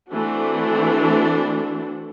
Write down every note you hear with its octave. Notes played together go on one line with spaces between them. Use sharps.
E3 A3 C4 D4 F#4